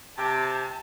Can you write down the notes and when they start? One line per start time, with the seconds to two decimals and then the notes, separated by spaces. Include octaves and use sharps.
0.18 C3 G4 A5